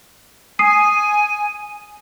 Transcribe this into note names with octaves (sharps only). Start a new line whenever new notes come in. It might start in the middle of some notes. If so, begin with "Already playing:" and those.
G#5 D#6 C7 D#7